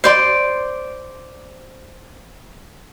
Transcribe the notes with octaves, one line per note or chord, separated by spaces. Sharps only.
C5 D5 C6